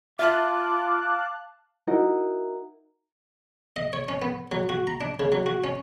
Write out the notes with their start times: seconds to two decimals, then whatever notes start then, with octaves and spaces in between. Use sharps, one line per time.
0.19 F4 E5 F5 A5 D6 F#6
1.87 D#4 E4 F#4 A#4
3.76 D#5
3.93 C#5
4.09 C#4
4.22 B3
4.52 F#3
4.69 F#4
4.87 A#5
5.01 D4
5.20 C#3
5.32 F#3
5.46 F#4
5.64 C#4